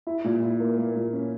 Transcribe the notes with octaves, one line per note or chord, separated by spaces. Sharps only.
E4
A#2
E4
A#3
A#3
A#2
C#4